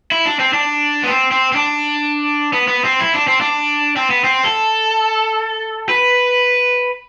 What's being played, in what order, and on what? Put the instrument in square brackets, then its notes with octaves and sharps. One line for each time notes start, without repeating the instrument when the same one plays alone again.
[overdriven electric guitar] E4
D4
C4
D4
B3
C4
C4
C4
D4
B3
B3
C4
E4
D4
C4
D4
C4
B3
C4
A4
B4